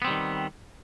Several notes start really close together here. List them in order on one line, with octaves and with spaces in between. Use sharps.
B3 C4 G3 D#3